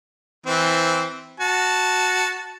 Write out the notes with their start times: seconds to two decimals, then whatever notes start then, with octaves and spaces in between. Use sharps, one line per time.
0.46 E3 C4
1.40 F#4 A5